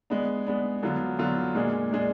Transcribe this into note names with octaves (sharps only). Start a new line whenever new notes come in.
G#3 B3 D4
G#3 B3 D4
D3 F#3 B3 F4
D3 F#3 B3 F4
A#2 G#3 D4 G#4
A#2 G#3 D4 G#4